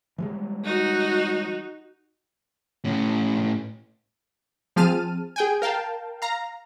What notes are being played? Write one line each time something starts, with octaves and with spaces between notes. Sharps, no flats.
E3 G3 G#3
D#4 F#4
A2 C#4
F3 C4 G#4 A5 F6 D#7
G#4 G5 G#5
A#4 F5 G5 A5
F5 A#5